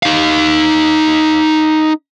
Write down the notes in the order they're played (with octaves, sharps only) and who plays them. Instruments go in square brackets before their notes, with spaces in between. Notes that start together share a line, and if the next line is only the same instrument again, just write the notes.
[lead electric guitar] D#4 F5